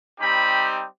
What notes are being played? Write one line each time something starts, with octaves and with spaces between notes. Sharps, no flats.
G3 C4 D#4 G4 B5